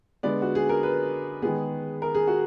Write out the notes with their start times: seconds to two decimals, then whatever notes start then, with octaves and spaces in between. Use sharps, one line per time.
0.23 D3 G#3 B3 D5
0.42 F#4
0.55 G#4
0.69 A#4
0.83 B4
1.42 D#3 G#3 B3 G#4
2.02 A#4
2.15 G#4
2.28 F#4